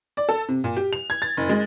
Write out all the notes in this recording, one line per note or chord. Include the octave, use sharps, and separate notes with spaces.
D5
A4
C3
A#2
G4
F7
G#6
A6
F#1
G#3